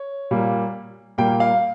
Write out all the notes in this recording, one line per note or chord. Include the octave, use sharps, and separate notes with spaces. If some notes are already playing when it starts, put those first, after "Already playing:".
Already playing: C#5
A#2 G3 A#3
A#2 G3 A#3 G5
F5